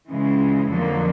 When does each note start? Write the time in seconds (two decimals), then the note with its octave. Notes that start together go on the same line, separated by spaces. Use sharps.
0.10 C#3 E3 G#3
0.69 F2 D3 F#3 A#3